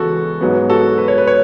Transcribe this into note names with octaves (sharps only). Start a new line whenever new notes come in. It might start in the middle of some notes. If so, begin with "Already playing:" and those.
Already playing: C#3 E3 G#3 B3 F#4 A4
G#2 F#3 B3
F#4 A4
B4
C#5
B4
C#5